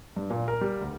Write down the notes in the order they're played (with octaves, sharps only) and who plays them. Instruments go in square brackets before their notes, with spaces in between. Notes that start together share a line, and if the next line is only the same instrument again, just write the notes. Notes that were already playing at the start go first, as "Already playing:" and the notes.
[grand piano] G2
A#2
A#4
G3
D2